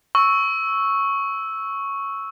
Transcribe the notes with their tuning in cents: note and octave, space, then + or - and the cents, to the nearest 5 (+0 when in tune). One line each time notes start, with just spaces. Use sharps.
C#6 +0 E6 -5